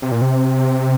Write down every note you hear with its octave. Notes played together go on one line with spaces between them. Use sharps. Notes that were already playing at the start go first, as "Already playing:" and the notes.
C3
A#2
C3